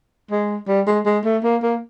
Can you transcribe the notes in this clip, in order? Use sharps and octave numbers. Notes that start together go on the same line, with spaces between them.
G#3
G3
G#3
G#3
A3
A#3
A#3